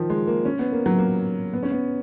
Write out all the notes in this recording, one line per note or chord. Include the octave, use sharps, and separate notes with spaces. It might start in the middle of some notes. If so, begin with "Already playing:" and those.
Already playing: D#3 F3
G#3
A#3
C#4
B3
A#3
F#3
A#3
B3
C#4
B3